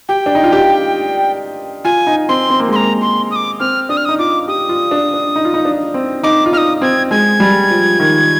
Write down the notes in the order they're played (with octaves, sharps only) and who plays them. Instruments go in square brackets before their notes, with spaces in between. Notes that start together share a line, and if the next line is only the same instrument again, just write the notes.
[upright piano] G4 [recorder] G5
[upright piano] D4
D#4
F4
G4
[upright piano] F4 [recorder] G#5
[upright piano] D#4
[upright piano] C4 [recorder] C6
[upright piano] C4
A#3
[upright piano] G#3 [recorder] C6
[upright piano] A#3 [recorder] A#5
[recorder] C6
D#6
D6
[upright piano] C4 [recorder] F6
[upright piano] D4 [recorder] D#6
[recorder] F6
[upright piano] D#4 [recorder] D#6
[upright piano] F4 [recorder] D6
[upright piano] G4 [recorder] D#6
[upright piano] F4
D4
D4
D#4
F4
D#4
D4
C4
[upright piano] D#4 [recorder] D6
[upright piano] F4
[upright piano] D#4 [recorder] F6
[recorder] D#6
[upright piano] C4 [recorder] G#6
[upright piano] G#3 [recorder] G#6
[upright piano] G3
F3
D#3